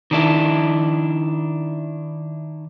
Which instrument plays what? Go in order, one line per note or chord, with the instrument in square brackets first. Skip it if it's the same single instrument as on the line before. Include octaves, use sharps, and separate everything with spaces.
[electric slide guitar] D#3 D4 E4